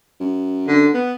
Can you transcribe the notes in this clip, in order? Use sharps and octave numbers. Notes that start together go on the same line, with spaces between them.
F#2
D3
B3